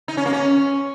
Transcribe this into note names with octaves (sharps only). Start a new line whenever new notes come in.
D#4
C#4
A#3
C#4